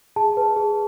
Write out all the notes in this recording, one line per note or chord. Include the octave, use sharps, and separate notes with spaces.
G#4 A5
B4
G#4